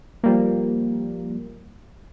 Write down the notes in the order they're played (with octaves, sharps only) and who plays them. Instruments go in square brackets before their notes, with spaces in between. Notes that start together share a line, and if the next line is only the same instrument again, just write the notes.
[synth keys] F3 G3 A#3